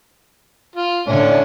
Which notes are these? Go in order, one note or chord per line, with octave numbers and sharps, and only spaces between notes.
F4
A2 D3 C#4 D4